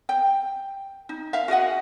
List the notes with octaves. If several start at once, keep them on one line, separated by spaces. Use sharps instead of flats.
G5
D#4
E5 F5
F#4 G#4 D#5 F#5